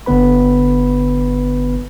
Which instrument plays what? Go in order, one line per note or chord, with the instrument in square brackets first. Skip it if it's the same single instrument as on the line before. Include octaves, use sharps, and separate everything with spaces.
[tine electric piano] G1 D3 B3 B4 B5